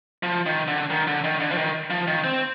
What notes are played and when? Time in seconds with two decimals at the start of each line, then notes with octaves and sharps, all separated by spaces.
0.23 F3
0.46 D#3
0.68 D3
0.90 D#3
1.07 D3
1.24 D#3
1.40 D3
1.52 F3
1.58 D#3
1.90 F3
2.07 D#3
2.24 C4